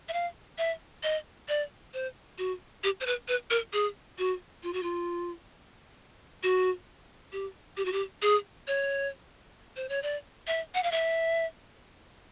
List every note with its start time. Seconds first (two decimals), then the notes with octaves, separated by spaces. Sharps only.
0.09 E5
0.13 F5
0.58 E5
1.03 D#5
1.48 D5
1.94 C5
2.38 F#4
2.84 G4
3.00 C5
3.06 B4
3.28 B4
3.51 A#4
3.73 G#4
4.18 F#4
4.63 F4
4.73 F#4
4.83 F4
6.43 F#4
7.32 G4
7.77 G4
7.85 F#4
7.92 G4
8.22 G#4
8.67 C#5
9.76 C5
9.89 C#5
10.03 D5
10.47 E5
10.75 F#5
10.83 F5
10.92 E5